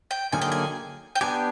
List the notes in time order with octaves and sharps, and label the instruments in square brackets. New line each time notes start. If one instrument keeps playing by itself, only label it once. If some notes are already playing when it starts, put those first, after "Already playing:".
[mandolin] G5
[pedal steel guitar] D3 F#3 A#3 D#4 G#4 [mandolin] G#5
[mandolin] G5
G#5
G5
[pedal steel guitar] B3 D4 G4 [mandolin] G#5